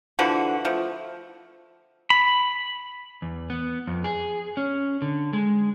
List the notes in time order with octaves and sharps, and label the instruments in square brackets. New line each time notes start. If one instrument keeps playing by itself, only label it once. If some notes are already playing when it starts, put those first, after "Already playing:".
[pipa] D3 E3 F3 F#4
F3 A3
[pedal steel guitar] B5
[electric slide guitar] E2
B3
F2
G#4
C#4
D3
G#3